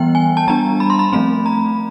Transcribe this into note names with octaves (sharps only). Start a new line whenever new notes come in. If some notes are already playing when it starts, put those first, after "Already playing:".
Already playing: E3 G3 B3 G5
G#5
A5
G3 B3 D4 A#5
B5
C6
B5
F3 A3 C4 B5
A#5